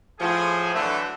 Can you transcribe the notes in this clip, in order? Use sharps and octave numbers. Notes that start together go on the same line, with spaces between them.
A2 F3 G#4
D3 E3 F#3 A3